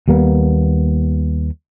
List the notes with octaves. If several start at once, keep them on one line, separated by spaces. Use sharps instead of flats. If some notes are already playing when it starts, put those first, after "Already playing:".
D#2 G3 A#3 B3